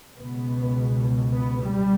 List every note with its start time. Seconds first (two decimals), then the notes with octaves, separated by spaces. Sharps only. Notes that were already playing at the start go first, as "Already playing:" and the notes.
0.19 C#2 B2 B3
1.32 B3
1.61 G3